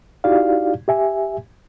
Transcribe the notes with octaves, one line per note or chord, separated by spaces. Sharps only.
D#4 E4 F#4 G4 D5 F5
G4 E5 G#5